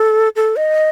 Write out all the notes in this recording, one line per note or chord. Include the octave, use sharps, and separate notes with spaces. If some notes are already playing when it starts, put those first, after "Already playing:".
Already playing: A4
A4
D#5